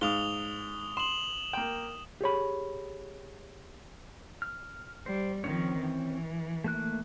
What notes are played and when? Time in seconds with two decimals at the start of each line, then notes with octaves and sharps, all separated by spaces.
0.01 G#2 F5 D#6 F7 G7
0.97 C6 E7 F#7
1.53 A#3 G5
2.21 G4 G#4 C#5 B5
4.42 F6
5.06 G3 C5
5.44 D#3 F3 C4 C#4 C#5
5.79 E3
6.64 A3 A#3 F#6